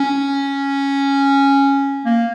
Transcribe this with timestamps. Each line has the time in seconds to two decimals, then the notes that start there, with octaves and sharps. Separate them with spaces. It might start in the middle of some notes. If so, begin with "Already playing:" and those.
Already playing: C#4
2.05 A#3